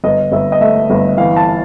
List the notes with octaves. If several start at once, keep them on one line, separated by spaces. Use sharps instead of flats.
G1 D#5
G1 E5
D#5
A3 E5
G1
E3 F5
A5